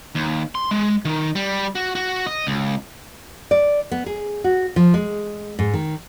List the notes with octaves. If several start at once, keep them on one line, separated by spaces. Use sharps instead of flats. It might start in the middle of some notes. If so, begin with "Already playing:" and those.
D#2
C6
G#3
D#3
G3
F#4
F#4
D#5
C#2
D5
B3
G#4
F#4
F3
G#3
G#2
D#3